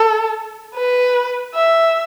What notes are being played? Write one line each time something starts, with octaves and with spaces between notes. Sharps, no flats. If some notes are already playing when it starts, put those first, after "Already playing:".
Already playing: A4
B4
E5